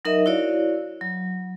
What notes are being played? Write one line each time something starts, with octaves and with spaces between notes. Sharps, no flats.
F#3 D#4 A#4 D#5 E5
E4 F#4 C#5 D5 F5
F#3